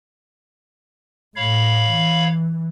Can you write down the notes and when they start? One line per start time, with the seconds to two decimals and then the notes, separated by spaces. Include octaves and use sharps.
1.36 A2 C#5 F5 B5
1.91 E3